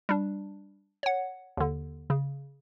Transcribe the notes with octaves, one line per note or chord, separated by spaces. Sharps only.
G3 D4
C#5 F#5
D#2 D3
C#3